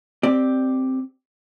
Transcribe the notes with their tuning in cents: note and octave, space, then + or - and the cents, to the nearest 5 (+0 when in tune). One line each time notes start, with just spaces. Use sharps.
C4 +0 G4 +0 D5 +10